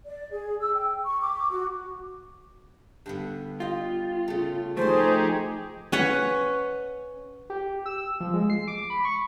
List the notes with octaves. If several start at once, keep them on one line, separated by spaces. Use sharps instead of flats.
D5
G#4
E6
G5
C#6
D6
F#4
G2 D3 B3
F4 G4 D#5
C#3 A3
F3 A3 D#4 G4 G#4 C5 G#5 A5
C#4 B4 F#5
G4
E6
F3
G#3
C7
D6
B5
C#6